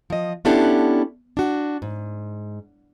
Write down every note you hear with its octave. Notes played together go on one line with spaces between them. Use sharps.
F3 D#5
B3 C#4 D4 E4 G4 A4
D4 F#4
G#2